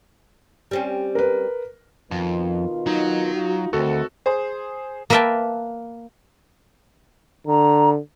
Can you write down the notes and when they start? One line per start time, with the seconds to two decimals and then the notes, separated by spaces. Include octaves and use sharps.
0.71 G3 C4 C#4
1.15 A#4 B4
2.11 F2 B2 D#3 F4
2.87 F#3 D#4
3.35 F4 F#4
3.73 D2 D#3 A3 C4 F#4 A4
4.26 G#4 C5
5.10 A#3 A#4 B4 E5 G5 A5
7.47 D3 A#5